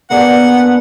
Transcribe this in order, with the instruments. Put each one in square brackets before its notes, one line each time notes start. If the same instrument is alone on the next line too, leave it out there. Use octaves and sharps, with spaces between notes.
[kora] A#3 D4 G#4 [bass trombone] B3 [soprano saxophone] F#5